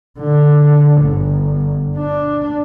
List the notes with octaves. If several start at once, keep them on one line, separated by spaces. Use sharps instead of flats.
D3
G1
D4